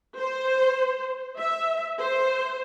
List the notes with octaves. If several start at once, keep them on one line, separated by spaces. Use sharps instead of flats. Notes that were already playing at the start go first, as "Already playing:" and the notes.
C5
E5
C5